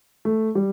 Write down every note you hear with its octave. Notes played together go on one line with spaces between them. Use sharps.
A3
G3